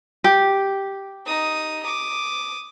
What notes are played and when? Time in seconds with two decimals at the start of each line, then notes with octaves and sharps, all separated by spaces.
0.24 G4
1.26 D#4 D#6
1.83 D6 D#6